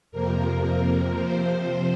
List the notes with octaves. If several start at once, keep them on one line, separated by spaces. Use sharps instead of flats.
F2 C3 F3 A#3 A#4
C3 F3 C4 C5